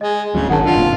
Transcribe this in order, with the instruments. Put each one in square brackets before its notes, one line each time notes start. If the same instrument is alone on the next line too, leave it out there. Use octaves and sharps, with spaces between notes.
[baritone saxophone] G#3 [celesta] D#5
[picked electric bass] D1 D2 F#3 [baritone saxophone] C#3
[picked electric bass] G#1 D#3 [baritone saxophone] F#2 [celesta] F#5 A5
[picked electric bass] D3 [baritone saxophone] F4
[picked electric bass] F#1 A#2